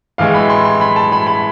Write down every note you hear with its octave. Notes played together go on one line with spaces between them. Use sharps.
A2 E3 G#3 F5
B5
C6
C6
B5
A5
B5
B5